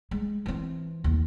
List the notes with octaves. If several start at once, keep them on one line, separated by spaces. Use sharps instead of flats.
G#3
E3 C4
D#2